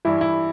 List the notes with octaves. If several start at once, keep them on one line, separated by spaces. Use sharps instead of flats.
G2 E3 E4
E4